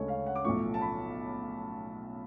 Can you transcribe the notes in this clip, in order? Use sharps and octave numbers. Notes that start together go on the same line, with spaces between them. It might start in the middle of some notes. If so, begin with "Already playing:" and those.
Already playing: D2 C#3 G#3 A4 C#5
F5
F#5
D6
B1 A2 F3 A3 C#6
A5
B5